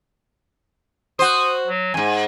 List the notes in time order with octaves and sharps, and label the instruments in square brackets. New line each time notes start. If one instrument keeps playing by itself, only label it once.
[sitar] F#4 C5 [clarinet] D#6
[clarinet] F#3
[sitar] F2 G#2 [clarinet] G#5